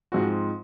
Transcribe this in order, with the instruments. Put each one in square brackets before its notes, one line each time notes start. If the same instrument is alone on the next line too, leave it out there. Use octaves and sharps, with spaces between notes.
[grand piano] G#2 F3 G#3 C4 F#4